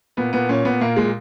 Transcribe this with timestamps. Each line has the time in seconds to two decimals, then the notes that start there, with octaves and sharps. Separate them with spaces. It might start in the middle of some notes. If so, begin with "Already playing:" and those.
0.17 A#2 B3
0.33 A#2 B3
0.49 A#2 C#4
0.65 A#2 B3
0.81 A#2 A#3
0.96 A#2 G#3